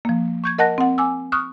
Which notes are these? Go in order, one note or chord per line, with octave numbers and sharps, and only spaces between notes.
F3 A#3
C#6 G6 G#6
A#4 D#5 F#5 A5 F#6 A#6
C4 F#5
G#5 D6 E6
C#6 D#6 F6 F#6